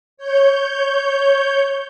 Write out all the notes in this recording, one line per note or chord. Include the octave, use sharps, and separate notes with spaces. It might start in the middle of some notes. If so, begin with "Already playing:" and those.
C#5 G6